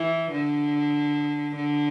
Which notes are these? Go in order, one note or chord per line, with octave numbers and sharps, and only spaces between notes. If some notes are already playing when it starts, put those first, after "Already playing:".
Already playing: E3
D3
D3